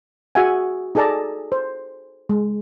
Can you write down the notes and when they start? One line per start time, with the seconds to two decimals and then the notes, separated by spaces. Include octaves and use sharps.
0.35 F#4 G#4 E5 F#5 G#5
0.95 D#4 G#4 A4 D5 A5 A#5
1.52 C5
2.29 G#3